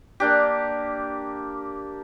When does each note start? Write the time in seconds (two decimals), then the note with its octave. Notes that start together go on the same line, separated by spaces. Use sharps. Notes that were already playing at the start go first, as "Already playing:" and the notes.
0.20 A#3 D4 G4